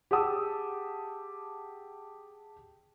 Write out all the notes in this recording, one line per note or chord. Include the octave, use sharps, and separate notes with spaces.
G4 G#4 F#5 A5 D#6 E6